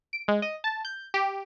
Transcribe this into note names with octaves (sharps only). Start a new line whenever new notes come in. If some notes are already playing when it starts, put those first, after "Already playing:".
D7
G#3
D#5
A5
G6
G4